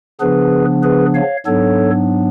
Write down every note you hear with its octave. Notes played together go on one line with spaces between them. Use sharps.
C#3 F3 B3 D4 G#4 B4
G#4 B4
C#5 F5
G#2 F#3 B3 D4 A4 C#5